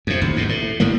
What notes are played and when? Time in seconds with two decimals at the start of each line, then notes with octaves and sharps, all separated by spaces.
0.07 F2 C3
0.21 A1 D#2
0.36 G#2 B2
0.49 A2
0.80 G1 A2 G3 A#3